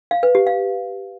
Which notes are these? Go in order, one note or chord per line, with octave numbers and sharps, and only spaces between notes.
F5
B4
G4
F5